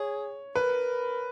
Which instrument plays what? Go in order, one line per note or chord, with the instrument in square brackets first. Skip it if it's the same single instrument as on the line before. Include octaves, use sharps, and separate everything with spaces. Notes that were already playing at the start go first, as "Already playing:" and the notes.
Already playing: [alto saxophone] G#4 [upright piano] C#5
[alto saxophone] A#4 [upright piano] B4